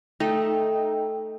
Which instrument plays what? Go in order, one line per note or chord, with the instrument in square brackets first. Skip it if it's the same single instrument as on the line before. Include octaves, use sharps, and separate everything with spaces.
[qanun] A3 [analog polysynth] D#4 [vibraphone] G5